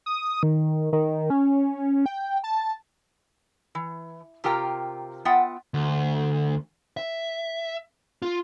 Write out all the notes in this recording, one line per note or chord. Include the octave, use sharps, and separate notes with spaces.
D#6
D#3
D#3
C#4
G5
A5
E3
C3 F4 G4 A#4 G5 A#5
B3 F4 E5 F#5 G5
D2
E5
F4